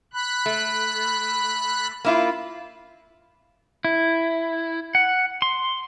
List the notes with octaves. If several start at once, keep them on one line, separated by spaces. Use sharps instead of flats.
B5 F#6
A3
A#3 E4 F4
E4
F#5
C6